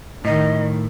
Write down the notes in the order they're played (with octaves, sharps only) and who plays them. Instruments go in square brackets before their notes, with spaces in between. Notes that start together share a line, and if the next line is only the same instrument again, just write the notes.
[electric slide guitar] A2 [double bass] D#3 [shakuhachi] D#5